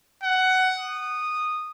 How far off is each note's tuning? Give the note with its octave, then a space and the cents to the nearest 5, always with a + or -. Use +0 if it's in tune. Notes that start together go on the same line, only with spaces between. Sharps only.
F#5 +15
D#6 -15